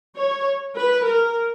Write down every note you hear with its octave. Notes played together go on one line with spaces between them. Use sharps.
C#5
B4
A#4